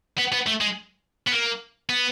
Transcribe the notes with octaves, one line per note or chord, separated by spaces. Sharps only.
B3
B3
A3
G#3
B3
A#3
B3